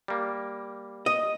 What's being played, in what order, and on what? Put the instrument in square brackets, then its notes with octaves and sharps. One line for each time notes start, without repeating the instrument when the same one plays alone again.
[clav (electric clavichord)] G3 A#3
[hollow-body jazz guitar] D#5